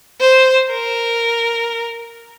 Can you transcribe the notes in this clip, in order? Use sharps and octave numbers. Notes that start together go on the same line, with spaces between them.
C5
A#4